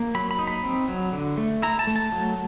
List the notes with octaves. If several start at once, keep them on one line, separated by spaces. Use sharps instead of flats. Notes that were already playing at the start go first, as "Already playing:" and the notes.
Already playing: A#3
F#3 B5
B5
D#4
B5
C4
F#3
D3
A3
E4 A#5
A5
A3
A5
F#3